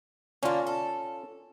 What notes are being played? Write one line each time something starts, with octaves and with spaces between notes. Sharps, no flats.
D3 A#3 C#4 F4
A4